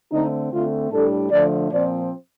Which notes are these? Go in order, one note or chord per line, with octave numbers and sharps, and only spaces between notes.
D3 A3 C4 D#4
D3 A3 C4 F4
A2 G3 D4 A4
D3 F3 A3 D4 D5
A#2 F3 C4 D5